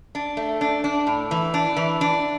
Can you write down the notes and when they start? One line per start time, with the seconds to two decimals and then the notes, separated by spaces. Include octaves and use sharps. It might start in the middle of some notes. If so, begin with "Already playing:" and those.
0.15 D4
0.37 A3
0.61 D4
0.84 D4
1.07 A2
1.31 E3
1.54 D4
1.77 E3
2.01 D4